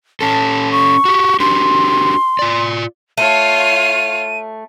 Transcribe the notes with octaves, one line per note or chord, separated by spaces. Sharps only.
C#4 A4 A5
C#6
F#4 G4
D4 F#4 G4 C6
F4 D5
A3 F4 C#5 F5 D#7